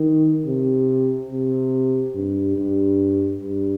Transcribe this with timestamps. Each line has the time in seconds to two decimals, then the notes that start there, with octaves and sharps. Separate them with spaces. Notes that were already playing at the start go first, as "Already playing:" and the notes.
Already playing: D#3
0.46 C3
1.31 C3
2.15 G2
2.58 G2
3.42 G2